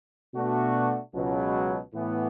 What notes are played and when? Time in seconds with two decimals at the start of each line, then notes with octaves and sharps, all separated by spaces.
0.34 B2 A3 D4 F#4
1.14 C#2 B2 F#3
1.93 A2 E3 B3